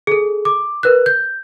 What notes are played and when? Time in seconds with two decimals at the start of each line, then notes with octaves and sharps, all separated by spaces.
0.07 G#4 A4
0.45 D6
0.83 A#4 B4 F#6
1.06 G6